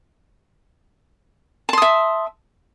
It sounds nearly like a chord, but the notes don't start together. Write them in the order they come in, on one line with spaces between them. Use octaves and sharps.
A5 C6 D#6 E5